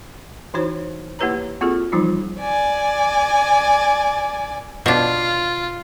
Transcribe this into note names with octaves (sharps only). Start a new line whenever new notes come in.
E3 D#4 E4 F#4 C5 C#5
A#3 E4 G4 B4 C#5 A#5
A#3 C4 F4 F#4 G#4 A4
E3 F3 G3 D#4 F4
D5 G#5
B2 D4 F4